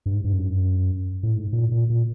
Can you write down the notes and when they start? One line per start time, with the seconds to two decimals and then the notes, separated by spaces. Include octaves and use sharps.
0.06 G2
0.15 G#2
0.24 G2
0.33 F#2
1.23 A2
1.34 G#2
1.53 A#2
1.71 A#2
1.90 A#2